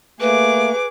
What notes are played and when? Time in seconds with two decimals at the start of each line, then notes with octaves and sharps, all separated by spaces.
0.21 A3 A#3 G#4 B4 D6